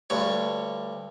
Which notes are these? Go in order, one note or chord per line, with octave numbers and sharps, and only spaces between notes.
D2 G2 C#5